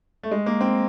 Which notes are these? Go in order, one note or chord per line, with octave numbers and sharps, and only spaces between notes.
A3
G#3
A#3
C4